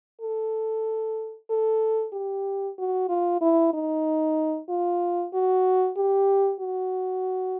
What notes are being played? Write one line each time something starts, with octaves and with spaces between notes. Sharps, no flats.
A4
A4
G4
F#4
F4
E4
D#4
F4
F#4
G4
F#4